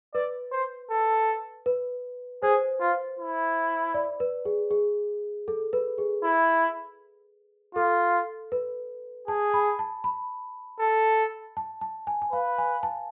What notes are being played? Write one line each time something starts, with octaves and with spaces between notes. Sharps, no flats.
B4 D5
C5
A4
B4
G#4 C5
F4
E4
D5
B4
G#4
G#4
A4
B4
G#4
E4
F4 A4
B4
G#4 A5
B5
A5
B5
A4
A5
A5
G#5
G#5
B4 F5
G#5
A5